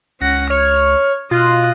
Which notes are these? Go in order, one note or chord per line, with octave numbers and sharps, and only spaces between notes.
C#2 C#4 F#5 A#6
C#5 F6
B2 F4 D#5 F#6